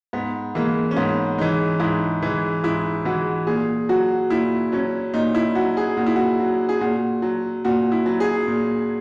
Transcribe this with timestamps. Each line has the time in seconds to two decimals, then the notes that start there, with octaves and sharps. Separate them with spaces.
0.13 G#2 B3
0.55 E3 G#3 A#3
0.91 C#4
0.97 G#2 B3
1.38 E3 G#3 D#4
1.80 G#2 E4
2.22 E3 G#3
2.64 G#2 E4
3.05 E3 G#3 F#4
3.47 A#2 G#4
3.89 F#3 F#4
4.30 A#2 E4
4.72 F#3 C#4
5.14 A#2 D#4
5.35 E4
5.55 F#3 F#4
5.77 G#4
5.97 A#2 F#4
6.06 E4
6.16 F#4
6.40 F#3
6.69 G#4
6.81 A#2 F#4
7.22 F#3
7.65 A#2 F#4
7.92 E4
8.06 F#3
8.20 G#4
8.48 A#2